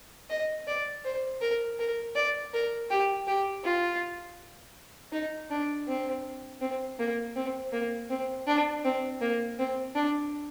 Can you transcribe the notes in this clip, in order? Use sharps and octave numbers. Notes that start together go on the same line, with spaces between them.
D#5
D5
C5
A#4
A#4
D5
A#4
G4
G4
F4
D#4
D4
C4
C4
A#3
C4
A#3
C4
D4
C4
A#3
C4
D4